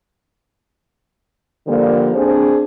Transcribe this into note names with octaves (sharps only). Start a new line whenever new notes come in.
D3 F3 G3 A#3
C4 D4 G#4 C5